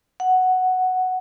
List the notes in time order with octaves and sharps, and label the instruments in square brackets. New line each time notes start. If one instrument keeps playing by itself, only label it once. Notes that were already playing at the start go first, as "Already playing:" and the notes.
[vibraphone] F#5